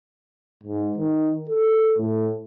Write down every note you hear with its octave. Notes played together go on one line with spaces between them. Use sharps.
G#2
D#3
A4
A2